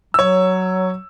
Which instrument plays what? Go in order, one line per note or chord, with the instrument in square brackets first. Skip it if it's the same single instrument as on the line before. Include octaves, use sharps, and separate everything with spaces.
[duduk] F#3 [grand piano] C#5 E6